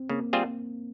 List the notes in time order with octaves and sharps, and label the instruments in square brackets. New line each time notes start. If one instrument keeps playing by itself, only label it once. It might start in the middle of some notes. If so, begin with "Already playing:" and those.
Already playing: [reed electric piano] C4
[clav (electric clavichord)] C#3 [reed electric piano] A#3
[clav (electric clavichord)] G3 C4 F4 G#4